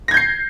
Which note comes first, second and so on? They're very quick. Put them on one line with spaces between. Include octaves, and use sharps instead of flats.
A#6 G#6 G6 C7